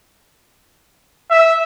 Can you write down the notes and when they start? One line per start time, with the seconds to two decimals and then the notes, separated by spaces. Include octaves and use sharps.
1.30 E5